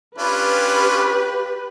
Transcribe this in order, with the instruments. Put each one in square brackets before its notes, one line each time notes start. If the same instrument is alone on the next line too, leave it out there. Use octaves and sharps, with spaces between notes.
[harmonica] C#4 D4 F4 [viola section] G4 B4